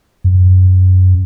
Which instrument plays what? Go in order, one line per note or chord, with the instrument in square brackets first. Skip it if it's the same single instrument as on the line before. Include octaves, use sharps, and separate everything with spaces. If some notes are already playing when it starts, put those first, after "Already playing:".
[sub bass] F#2